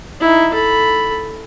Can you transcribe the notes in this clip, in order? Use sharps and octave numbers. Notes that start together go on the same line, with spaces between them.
D#4 E4
A4 B5